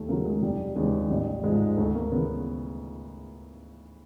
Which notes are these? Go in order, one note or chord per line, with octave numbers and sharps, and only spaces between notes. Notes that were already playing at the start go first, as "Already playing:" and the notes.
Already playing: D#2 A3
C#3 F#3 A#3
G#3
F1 G3
D#2 C#3 E3 G#3
A1 G3
G#2 F3 G#3
D2 A3
A#3
C#3 E3 B3